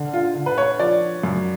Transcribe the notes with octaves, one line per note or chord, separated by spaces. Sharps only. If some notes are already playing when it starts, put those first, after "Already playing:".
Already playing: D3
F4
D3
B4
C#5
F3 D5
F#2